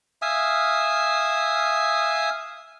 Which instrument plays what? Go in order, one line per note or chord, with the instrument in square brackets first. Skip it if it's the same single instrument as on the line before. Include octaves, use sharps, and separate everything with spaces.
[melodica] E5 F5 G#5 D#6